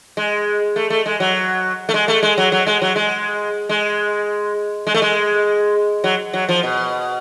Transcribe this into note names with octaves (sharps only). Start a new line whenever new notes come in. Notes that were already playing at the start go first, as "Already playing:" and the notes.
G#3
A3
A3
G#3
F#3
A3
G#3
A3
G#3
F#3
F#3
G#3
F#3
G#3
G#3
G#3
A3
G#3
F#3
F#3
F3
B2